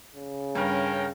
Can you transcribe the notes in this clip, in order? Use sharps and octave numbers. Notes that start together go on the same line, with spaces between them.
C#3
G2 C#4 A#4 G5